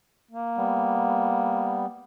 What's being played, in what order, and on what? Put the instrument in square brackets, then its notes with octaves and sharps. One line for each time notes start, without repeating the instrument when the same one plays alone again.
[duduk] A#3
[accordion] G3 B3